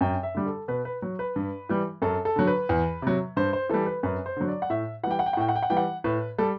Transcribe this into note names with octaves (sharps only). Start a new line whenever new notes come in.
F#2 G5
E5
D3 G3
A4
B2 B4
B4
F#3
B4
G2
E3 G3
F#2 A4
A4
D3 F#3
B4
E2
C3 F#3
G2 C5
C5
E3 G3 A4
B4
F#2 B4
C5
D3 F#3
D5
F#5
A2 E5
E3 G3 F#5 G5
F#5
G5
F#5
A2 G5
F#5
G5
F#5
E3 G3 G5
F#5
A2 B4
G3 A4